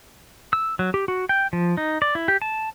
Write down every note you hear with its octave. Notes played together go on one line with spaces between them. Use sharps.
E6
F#3
G4
F#4
G5
F3
D#4
D5
E4
G4
A5